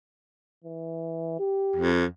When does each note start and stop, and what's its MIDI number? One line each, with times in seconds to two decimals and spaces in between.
0.64 1.39 52
1.39 1.90 67
1.76 2.05 41